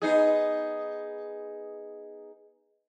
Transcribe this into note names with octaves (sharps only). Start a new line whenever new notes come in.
B3 D#4 G#4